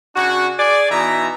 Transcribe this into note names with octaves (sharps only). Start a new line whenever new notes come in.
C#3 D4 F#4
G#4 D5
B2 E3 D#4 E5 A#5